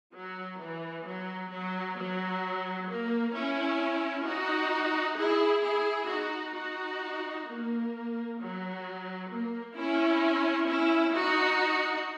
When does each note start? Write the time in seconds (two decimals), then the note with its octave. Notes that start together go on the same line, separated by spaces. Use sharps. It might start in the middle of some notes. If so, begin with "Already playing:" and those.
0.14 F#3
0.60 E3
1.05 F#3
1.52 F#3
1.97 F#3
2.89 A#3
3.34 C#4 E4
4.26 D#4 F#4
5.17 E4 G#4
5.63 E4 G#4
6.10 D#4 F#4
6.55 D#4 F#4
7.47 A#3
8.39 F#3
9.31 A#3
9.76 C#4 E4
10.67 C#4 E4
11.13 D#4 F#4